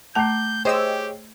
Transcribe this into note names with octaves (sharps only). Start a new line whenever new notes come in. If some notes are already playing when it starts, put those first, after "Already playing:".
A3 A5 A#5 D6 G6 C7
G4 G#4 C5 C#5 D#5 G5 E6